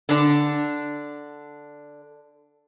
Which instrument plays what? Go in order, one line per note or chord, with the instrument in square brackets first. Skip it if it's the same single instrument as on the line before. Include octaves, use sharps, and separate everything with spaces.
[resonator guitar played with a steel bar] D3 D4